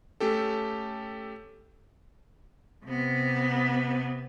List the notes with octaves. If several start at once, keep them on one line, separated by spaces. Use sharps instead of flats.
A3 C#4 G4 A4
C3 B3